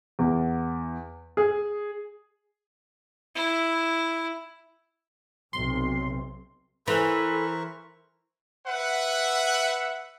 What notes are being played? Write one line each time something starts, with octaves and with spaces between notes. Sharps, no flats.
E2
G#4
E4
B1 C3 C6
E3 A4 A#4 C5 B5 C#6
B4 E5 F#5